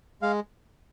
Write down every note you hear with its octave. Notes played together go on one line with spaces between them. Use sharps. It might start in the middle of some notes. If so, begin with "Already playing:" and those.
G#3 F5